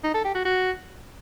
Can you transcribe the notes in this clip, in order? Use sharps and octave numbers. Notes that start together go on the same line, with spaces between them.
D#4
A4
G4
F#4
F#4